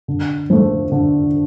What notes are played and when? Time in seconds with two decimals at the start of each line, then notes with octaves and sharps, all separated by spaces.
0.08 D3
0.50 F3 A3
0.92 D3